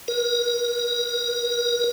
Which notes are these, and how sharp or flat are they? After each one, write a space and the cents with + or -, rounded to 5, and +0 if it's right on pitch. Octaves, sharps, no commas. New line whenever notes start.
A#4 +45